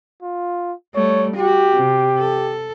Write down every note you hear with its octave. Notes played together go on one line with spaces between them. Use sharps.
F4
G3 A3 C#5
F#4 G4
C3
A4